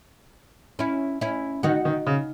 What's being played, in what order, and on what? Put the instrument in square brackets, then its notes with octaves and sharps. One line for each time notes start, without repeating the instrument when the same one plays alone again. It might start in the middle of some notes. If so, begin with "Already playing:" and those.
[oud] C#4 E4
C#4 E4
[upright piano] D#3 [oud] D#4 F#4
[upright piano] D#3
C#3